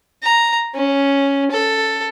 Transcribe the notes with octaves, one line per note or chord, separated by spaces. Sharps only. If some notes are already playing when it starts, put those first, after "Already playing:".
A#5
C#4
A4